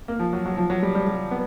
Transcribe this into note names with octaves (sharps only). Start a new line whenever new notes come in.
A#3
F3
F#3
F#3
F3
F#3
G3
G3
G3
B3